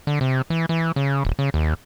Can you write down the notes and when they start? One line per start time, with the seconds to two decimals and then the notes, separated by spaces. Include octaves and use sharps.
0.07 D3
0.21 C3
0.50 E3
0.69 E3
0.96 C#3
1.25 D#1
1.39 C#3
1.54 D#2